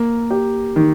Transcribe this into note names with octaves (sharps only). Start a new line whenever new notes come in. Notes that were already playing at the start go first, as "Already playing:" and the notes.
Already playing: A#3
G4
D#3